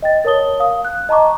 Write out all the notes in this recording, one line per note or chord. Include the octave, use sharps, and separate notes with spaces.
D#5 G5 A6
A#4 C#5 A5 D#6 G7
F5 D#6
F#6
D#5 A5 A#5 C#6 D6